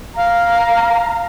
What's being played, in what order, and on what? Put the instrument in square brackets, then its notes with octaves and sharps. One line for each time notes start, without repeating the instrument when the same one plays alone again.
[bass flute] F5 [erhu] A#5